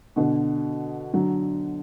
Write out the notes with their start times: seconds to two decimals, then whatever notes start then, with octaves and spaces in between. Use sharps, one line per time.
0.16 B2 D3
1.13 D3 F#3